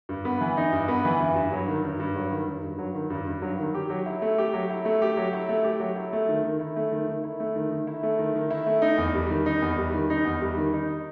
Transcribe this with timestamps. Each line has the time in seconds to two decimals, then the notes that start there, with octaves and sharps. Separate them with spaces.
0.09 G2
0.25 B3
0.41 E3
0.57 D#4
0.73 G2
0.88 B3
1.05 E3
1.20 G2
1.36 G2
1.52 F#3
1.68 D#3
1.84 G2
2.00 G2
2.16 F#3
2.31 D#3
2.47 G2
2.63 G2
2.79 F#3
2.94 D#3
3.10 G2
3.27 G2
3.42 F#3
3.59 D#3
3.75 G4
3.90 F#3
4.06 E4
4.22 A3
4.38 G4
4.54 F#3
4.70 E4
4.85 A3
5.02 G4
5.17 F#3
5.33 E4
5.49 A3
5.64 G4
5.80 F#3
5.96 E4
6.13 A3
6.29 D#3
6.44 D#3
6.60 E4
6.76 A3
6.92 D#3
7.08 D#3
7.24 E4
7.40 A3
7.56 D#3
7.71 D#3
7.87 E4
8.03 A3
8.19 D#3
8.35 D#3
8.50 E4
8.67 A3
8.82 D#4
8.98 E2
9.15 G3
9.30 D#3
9.46 D#4
9.62 E2
9.78 G3
9.94 D#3
10.10 D#4
10.25 E2
10.42 G3
10.57 D#3
10.73 D#4